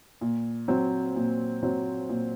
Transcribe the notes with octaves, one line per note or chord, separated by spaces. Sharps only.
A#2
F#3 C4
A#2
F#3 C4
A#2